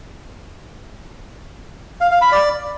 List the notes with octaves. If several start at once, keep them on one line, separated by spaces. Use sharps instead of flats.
F5
F5
B5
D5